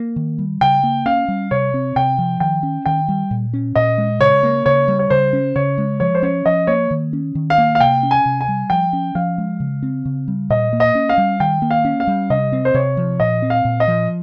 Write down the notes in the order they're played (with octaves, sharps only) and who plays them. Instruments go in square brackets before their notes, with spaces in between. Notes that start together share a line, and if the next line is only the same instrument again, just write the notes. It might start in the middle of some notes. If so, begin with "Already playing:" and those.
Already playing: [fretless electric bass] A#3
D#3
G3
[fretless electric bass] C#3 [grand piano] G5
[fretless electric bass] A#3
[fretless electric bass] C#4 [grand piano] F5
[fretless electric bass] G3
[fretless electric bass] C3 [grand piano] C#5
[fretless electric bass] C4
[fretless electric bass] C3 [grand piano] G5
[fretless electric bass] F3
[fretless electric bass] D#3 [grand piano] G5
[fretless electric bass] C#4
[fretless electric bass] D#3 [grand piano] G5
[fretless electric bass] G3
A#2
C#4
[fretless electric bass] A#2 [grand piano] D#5
[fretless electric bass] G#3
[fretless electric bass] C#3 [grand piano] C#5
[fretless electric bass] A#3
[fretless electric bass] C#3 [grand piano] C#5
[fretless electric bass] G3
[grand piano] C#5
[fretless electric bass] C#3 [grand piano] C5
[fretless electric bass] C#4
[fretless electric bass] C#3 [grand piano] C#5
[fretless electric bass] G#3
[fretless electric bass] F3 [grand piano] C#5
[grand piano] C5
[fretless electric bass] C#4 [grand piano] C#5
[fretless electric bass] F3 [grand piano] D#5
[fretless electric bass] A#3 [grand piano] C#5
[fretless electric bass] D#3
C#4
D#3
[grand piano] F5
[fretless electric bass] A#3
[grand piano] F5
[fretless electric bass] C3 [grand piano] G5
[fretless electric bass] C#4
[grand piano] G#5
[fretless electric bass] C3
[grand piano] G#5
[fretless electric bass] G3
[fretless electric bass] F3 [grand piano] G5
[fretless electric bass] C#4
[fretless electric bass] F3 [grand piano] F5
[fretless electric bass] G#3
C#3
C4
C#3
G3
[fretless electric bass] A#2 [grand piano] D#5
[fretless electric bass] A#3
[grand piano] D#5
[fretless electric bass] C#4
[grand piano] F5
[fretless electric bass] G3
[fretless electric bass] D#3 [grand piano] G5
[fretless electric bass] A#3
[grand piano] F5
[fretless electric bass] C#4
[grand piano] F5
[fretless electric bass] G3
[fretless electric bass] C3 [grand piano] D#5
[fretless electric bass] C4
[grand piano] C5
[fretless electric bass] C3 [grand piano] C#5
[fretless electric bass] F3
[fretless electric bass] A#2 [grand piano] D#5
[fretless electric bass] C4
[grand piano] F5
[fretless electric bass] A#2
[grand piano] D#5
[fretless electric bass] F3